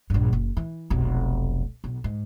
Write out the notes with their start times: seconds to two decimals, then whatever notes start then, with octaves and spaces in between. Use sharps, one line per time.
0.10 A#1 G2
0.33 F#1
0.57 E3
0.90 F1 B1
1.84 B1
2.04 G#2